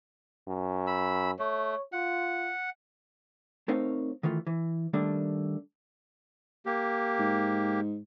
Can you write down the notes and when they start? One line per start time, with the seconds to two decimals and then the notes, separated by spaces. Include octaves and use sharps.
0.48 F#2
0.87 B5 E6
1.39 A3 C#5
1.93 F4 F#5
3.68 A3 C4 D#4 A#4 C#5 F5
4.23 D#3 E3 A3 F4
4.47 E3
4.93 D#3 G3 A3 A#3 D4
6.66 A#3 G4
7.19 G#2